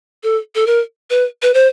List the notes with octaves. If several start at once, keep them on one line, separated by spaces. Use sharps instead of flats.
A4
A4
A#4
B4
B4
C5